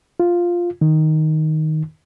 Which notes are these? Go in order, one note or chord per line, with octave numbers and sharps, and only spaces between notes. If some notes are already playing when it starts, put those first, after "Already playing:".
F4
D#3